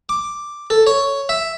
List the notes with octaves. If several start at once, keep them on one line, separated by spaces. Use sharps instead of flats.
D6
A4
C#5
E5